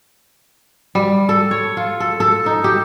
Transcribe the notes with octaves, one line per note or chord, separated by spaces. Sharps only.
G3
A4
C#5
F4
A4
A4
D#4
G4